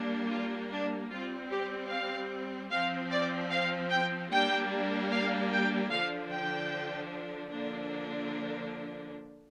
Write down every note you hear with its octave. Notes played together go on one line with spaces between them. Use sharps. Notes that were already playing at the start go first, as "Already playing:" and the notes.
Already playing: G3 A#3 D4
F4
D4
G3 C4 F4
G4
F5
F3 C4 F5
D5
F5
G5
G3 A#3 D4 G5
F5
G5
D3 F3 D4 F5
G5
D3 F3 A#3 D4